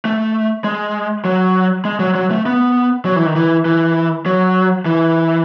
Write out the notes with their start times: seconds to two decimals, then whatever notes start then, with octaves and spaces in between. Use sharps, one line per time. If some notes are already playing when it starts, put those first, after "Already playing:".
0.05 A3
0.64 G#3
1.25 F#3
1.85 G#3
2.00 F#3
2.15 F#3
2.31 A3
2.46 B3
3.05 F#3
3.16 E3
3.26 D#3
3.36 E3
3.65 E3
4.26 F#3
4.86 E3